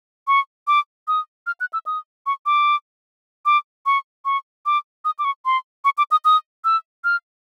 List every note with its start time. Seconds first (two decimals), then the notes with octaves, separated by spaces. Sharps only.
0.28 C#6
0.67 D6
1.08 D#6
1.47 F6
1.60 F#6
1.73 E6
1.86 D#6
2.26 C#6
2.46 D6
3.46 D6
3.86 C#6
4.25 C#6
4.66 D6
5.05 D#6
5.19 D6
5.25 C#6
5.45 C6
5.85 C#6
5.98 D6
6.11 D#6
6.25 D#6
6.65 E6
7.04 F6